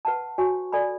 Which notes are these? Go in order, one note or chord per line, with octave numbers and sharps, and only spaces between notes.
B4 F#5 A5
F#4 C#5 G#5 C#6
A4 D5 G#5 B5